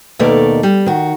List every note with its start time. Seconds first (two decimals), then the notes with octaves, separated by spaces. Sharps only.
0.19 D#2 B2 A3 A4 A#4 D5
0.63 G3
0.86 D#3 F#4